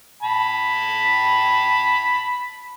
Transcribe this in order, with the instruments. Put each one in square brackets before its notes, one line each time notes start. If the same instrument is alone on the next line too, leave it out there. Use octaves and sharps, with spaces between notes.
[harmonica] A5 B5